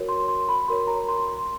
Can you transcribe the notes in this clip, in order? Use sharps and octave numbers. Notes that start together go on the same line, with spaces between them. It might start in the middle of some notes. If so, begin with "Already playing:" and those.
Already playing: F#4 A#4 C#5
C6
C6
B5
F#4 A#4 C#5 C6
A#5
C6
C6